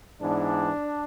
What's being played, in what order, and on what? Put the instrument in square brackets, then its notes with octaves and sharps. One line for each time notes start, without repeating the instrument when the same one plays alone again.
[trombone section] G#2 E3 B3 D4